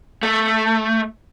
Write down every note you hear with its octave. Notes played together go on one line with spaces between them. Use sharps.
A3